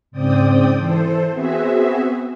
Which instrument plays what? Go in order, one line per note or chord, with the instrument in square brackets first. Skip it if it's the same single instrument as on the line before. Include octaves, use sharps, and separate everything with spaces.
[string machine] G#2 C#3 C4 D5 G5 D#6
E3 A4 C5
B3 C4 F#4 G#4 E5